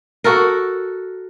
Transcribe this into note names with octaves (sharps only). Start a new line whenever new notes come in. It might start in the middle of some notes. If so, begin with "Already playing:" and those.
F#4 A4 A#4